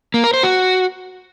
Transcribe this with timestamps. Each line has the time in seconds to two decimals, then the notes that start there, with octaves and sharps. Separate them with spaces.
0.14 A#3
0.24 A#4
0.34 C5
0.43 F#4